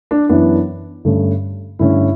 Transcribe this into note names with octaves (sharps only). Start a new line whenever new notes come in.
D4
F#2 E3 B3 D4
G2 D3 A3 C#4
G2 D3 A3 C#4 E4